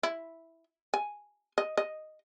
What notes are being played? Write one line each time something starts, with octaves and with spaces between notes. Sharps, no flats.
E4
G#5
D#5
D#5